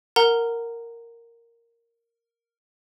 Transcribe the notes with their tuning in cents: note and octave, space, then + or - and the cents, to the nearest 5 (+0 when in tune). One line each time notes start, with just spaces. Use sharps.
A#4 -5 F#5 +0 A#5 -10